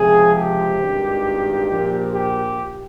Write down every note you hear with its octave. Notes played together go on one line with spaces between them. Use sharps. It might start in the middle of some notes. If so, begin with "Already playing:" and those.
Already playing: C#2 C3 F3 G#4
G4
G#1 G2 D#3
A#1 A#2 F3
G4